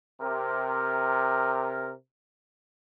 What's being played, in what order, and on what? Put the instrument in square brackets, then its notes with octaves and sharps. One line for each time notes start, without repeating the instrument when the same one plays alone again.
[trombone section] C3 A#4